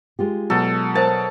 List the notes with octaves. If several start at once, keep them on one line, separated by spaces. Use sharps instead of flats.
G#3 F4 G4
B2 F#3 A4
A#4 C5 A5